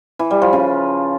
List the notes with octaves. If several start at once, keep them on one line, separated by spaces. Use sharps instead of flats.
E3
G3
F3
C#3